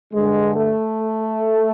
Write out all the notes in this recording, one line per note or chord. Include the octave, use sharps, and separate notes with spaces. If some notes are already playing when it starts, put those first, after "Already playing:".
G2 D3 G#3
A3